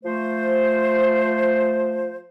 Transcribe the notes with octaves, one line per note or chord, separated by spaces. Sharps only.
F3 A3 C5